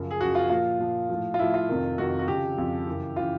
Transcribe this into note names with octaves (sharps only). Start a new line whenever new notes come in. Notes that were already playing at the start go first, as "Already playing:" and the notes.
Already playing: F#2 C#3 F3
G#4
F#2 C#3 F3 F#4
F4
A#2 F3 F4
A#2 F3
A2 F3
F4
A2 F3 E4
F4
F2 C3 D#3
F2 C3 D#3 F#4
F#4
F2 C#3 F3 G4
F2 C#3 F3
F#2 C#3 E3
C#3 E3 F4